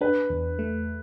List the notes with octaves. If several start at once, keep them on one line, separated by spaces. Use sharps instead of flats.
D4 B4
E2
A3